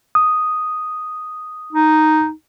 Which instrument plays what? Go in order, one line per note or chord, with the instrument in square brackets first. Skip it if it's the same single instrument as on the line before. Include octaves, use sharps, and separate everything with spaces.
[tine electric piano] D#6
[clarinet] D#4